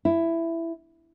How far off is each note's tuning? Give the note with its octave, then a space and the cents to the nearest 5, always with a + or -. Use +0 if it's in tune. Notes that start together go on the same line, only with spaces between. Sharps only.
E4 +10